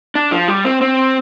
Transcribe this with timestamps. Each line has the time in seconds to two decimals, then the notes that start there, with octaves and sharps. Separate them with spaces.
0.15 D4
0.32 F3
0.48 G3
0.64 C4
0.81 C4